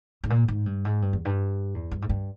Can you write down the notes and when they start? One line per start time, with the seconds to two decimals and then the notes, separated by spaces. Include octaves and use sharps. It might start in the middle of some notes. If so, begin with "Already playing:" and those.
0.24 G#2
0.30 A#2
0.48 G#2
0.66 G2
0.85 G#2
1.02 G2
1.13 E2
1.25 G2
1.74 E2
1.91 G2
2.02 G#2
2.09 G2